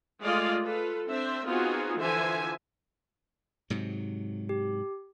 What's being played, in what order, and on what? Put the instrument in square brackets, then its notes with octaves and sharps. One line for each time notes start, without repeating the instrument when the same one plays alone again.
[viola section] G#3 A3 F4 D5 D#5 F5
F4 A4 B4
C4 D4 C5 E5
B3 C4 D#4 F4 F#4 G#4
D3 E3 F3 C5 E5 G#5
[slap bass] G#2 C3 F#3
[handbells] G4